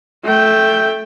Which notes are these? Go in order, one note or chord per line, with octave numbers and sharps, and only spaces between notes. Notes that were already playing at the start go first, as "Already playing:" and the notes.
A3 G5